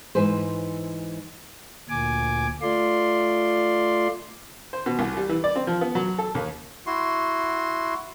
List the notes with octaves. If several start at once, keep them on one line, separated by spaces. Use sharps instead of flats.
G#2 E3 B4 C5
D2 A#2 G#5 D6
A3 F4 D5 C6
C5
B2
C2
G3
E3
D5
C4
F3
B3
F#3
A4
D#2
E4 F#4 C6